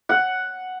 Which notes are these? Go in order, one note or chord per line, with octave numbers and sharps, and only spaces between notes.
F#5